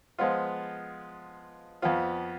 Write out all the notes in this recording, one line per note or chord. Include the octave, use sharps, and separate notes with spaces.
F3 G#3 B3 F4
F2 F3 B3 F4